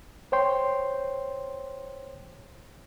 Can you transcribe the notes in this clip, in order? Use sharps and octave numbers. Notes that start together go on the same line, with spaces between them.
C5 C#5 G5 C6